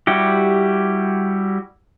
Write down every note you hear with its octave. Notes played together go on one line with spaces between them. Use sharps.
G3 E4 F#4 G4